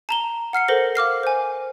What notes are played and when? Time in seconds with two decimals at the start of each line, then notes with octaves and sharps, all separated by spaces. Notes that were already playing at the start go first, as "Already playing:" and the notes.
0.09 A5 A#5 G7
0.53 F#5 F6 C7 C#7
0.68 A4 A#4 C5 A#6
0.95 F5 D6 F6 C7
1.23 C5 G#5